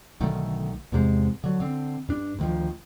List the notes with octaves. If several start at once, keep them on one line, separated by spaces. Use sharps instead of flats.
B1 D3 D#3 A3
E2 G#2 C3 G#3
D3 F#3
D3 C4
G2 D4
D2 D#3 F3